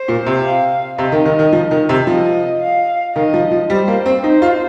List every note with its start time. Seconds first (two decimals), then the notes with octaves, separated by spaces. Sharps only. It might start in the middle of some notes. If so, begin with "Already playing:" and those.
Already playing: C5
0.08 A#2
0.26 C3
0.45 F5
0.98 C3 D#5
1.12 D#3
1.26 D#3
1.39 D#3
1.52 F3
1.71 D#3
1.89 C3
2.07 F3 D#5
2.61 F5
3.15 D#3 D#5
3.34 F3
3.51 F3
3.70 G3 C5
3.88 A#3
4.06 C4
4.24 D#4 C5
4.42 F4